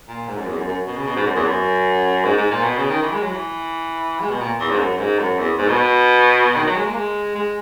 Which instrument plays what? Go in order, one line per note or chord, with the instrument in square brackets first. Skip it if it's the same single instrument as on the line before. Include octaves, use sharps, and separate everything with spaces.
[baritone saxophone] A#2
G#2
F#2
E2
F#2
F#2
B2
C#3
B2
G#2
F#2
E2
F#2
G#2
G#2
A#2
B2
C#3
D#3
E3
G#3
F#3
E3
G#3
B2
A#2
E2
G#2
F#2
G#2
F#2
E2
G#2
B2
D#3
F#3
G#3
A#3
G#3
G#3